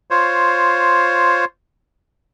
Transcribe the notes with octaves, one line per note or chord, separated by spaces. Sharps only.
F4 C5 C#5